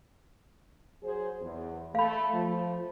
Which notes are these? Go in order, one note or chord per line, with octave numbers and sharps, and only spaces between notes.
F#3 G#4 C5
E2
A3 F5 B5
F3